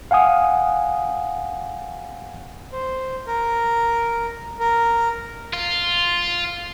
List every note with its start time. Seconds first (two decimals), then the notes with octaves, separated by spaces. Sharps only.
0.11 F5 F#5 G#5 D#6
2.73 C5
3.27 A#4
4.60 A#4
5.53 F4